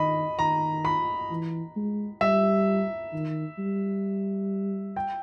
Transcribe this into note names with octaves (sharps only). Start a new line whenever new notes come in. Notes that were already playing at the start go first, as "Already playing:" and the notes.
Already playing: D#3 D#5 B5
D#3 A#5
B5
E3
G#3
G3 E5
D#3
G3
G5